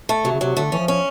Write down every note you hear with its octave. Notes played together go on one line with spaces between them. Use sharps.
A3
C3 F#3
C#3
C3 F#3
D3 A3
E3 C#4
F3
C#4